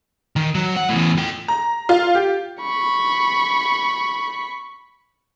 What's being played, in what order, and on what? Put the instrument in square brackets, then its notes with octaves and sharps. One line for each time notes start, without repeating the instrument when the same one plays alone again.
[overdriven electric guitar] D#3
F#3
F#5
E2 A2
F4 G5
[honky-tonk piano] A#5
F4
G4
[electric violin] B5 C#6